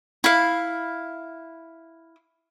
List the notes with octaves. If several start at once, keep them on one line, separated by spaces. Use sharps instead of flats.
E4 F5